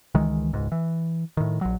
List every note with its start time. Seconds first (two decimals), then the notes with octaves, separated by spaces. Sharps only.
0.15 C#2 D#3 E3 G#3
0.53 E1 C#2 G#2
0.72 E3
1.37 A2 D#3
1.61 A#1 F#3